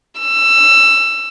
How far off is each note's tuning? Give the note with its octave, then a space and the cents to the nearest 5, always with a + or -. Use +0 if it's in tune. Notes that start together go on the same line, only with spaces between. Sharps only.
E6 +20